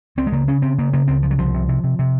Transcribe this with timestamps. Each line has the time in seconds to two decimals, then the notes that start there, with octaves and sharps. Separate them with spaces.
0.17 C#2 C4
0.27 G#3
0.32 C#3 A#3
0.48 C#3 C#4
0.62 C#3 C4
0.78 C#3 A#3
0.93 C#3 A#3
1.08 C#2 C4
1.23 C#3 F3
1.31 F#3
1.39 C2 F3
1.54 C3
1.68 C3
1.84 C3
1.99 C3